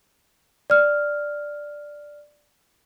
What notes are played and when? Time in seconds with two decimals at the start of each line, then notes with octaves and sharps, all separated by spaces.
0.70 D5 F6